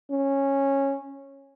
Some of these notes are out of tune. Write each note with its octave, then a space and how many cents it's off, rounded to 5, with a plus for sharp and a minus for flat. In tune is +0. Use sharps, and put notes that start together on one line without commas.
C#4 -10